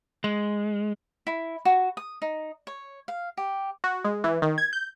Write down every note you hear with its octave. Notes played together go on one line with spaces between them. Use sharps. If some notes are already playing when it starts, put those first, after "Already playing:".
G#3
E4
F#4
D#6
D#4
C#5
F5
G4
F#4
G#3
E3
D#3
G#6
G6